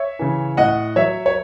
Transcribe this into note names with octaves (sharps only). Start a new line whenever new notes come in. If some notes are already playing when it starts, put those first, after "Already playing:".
Already playing: C#5 E5
C#3 E3
A2 D#5 F#5
F#3 C#5 E5
C#5